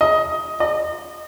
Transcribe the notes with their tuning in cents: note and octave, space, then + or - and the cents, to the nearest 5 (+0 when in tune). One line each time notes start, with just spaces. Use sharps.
D#5 +15
D#5 -30